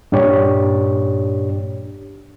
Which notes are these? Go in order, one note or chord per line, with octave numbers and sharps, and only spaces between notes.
G2 A#2 D4 G4 C#5